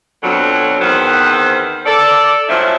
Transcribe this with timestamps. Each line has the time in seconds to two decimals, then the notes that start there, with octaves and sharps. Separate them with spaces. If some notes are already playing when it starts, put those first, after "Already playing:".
0.22 F2 B2 D3 F#3
0.81 E2 D#3 B3 C4 B4 C5
1.86 A4 D5
2.49 F3 F#3 A3 C4 C#4 E4